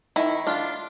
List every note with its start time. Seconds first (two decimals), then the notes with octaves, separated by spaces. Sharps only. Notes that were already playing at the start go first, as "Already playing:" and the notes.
0.16 D#3 E4
0.47 D4 F4